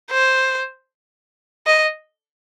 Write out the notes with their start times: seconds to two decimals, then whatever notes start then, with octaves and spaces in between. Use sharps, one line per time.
0.11 C5
1.66 D#5